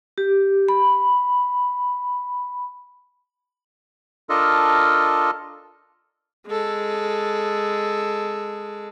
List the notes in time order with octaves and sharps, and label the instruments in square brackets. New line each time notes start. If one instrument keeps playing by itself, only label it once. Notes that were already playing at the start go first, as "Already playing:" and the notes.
[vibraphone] G4
B5
[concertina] D4 F4 A4 A#4 D#5
[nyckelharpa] G#3 A4